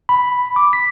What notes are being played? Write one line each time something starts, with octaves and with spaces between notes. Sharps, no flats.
B5
D6
B6